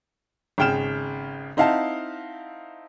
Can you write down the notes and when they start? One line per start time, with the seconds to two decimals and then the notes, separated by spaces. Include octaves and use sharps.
0.58 G#1 C#3 G5 F6 E7
1.57 C4 D#4 E4 F5 F#5 A5